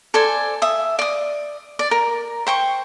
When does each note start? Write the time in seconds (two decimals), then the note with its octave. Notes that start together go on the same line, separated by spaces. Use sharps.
0.14 A4 C5 D5 G#5
0.62 E5 D#6
0.99 D5 D#6
1.79 D5
1.91 A#4
2.47 C5 G5 C#6